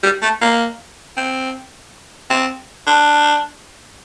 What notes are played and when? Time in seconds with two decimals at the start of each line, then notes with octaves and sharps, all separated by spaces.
0.03 G3
0.22 A3
0.41 A#3
1.17 C4
2.30 C4
2.87 D4